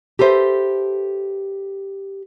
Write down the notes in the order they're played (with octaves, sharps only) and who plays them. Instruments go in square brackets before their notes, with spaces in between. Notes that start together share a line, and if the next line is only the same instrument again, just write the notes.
[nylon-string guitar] G4 A4 B4 C5 E5